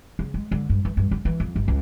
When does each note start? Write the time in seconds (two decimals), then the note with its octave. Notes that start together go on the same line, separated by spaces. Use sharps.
0.19 C#3
0.34 G#3
0.51 D3
0.69 G2
0.85 E3
0.97 G2
1.11 D3
1.25 E3
1.40 F2
1.56 G1
1.68 C#2